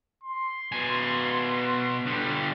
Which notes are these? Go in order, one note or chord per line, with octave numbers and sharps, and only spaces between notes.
C6
B2 G#5
D3 G3